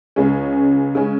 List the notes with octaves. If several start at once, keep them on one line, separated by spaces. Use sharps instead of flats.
C#2 C#3 G#3 C#4
C#3 G#3 C#4